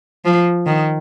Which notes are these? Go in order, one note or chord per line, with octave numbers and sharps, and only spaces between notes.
F3
D#3